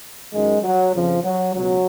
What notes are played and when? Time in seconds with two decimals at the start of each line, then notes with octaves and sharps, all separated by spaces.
0.32 F#2 D#3 G#3
0.62 F#3
0.93 F2 C#3 F3
1.24 F#3
1.54 C#2 B2 F#3